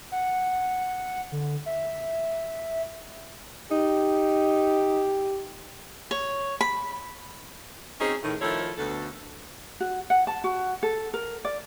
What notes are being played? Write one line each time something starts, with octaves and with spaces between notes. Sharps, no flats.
F#5
D3
E5
D#4 G4
C#5
B5
C4 C#4 D#4 F#4 G#4 C5
A2 D#3
D#3 F3 A3 E4 A4 C#5
D2 B2 A4
F#4
F#5
A5
F#4
A4
A#4
D5